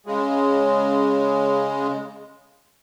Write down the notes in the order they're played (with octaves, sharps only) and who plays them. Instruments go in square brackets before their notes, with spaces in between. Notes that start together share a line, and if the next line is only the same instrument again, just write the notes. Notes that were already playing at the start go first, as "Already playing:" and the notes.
[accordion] C#3 G#3